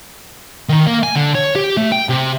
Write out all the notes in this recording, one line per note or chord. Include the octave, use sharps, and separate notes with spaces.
D#3
A#3
G#5
D3
C#5
G4
A3
G5
C3